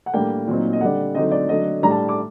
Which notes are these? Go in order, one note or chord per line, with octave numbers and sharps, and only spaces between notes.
F#5
A2 G3 A#3 D4 G5
A#2 F#3 C4 D#4
D#5
D3 G3 D4 F#5
D3 F#3 C4 D#4 D#5
D5
D3 F#3 A3 D4 D#5
A2 G3 D4 A#5
A5
D6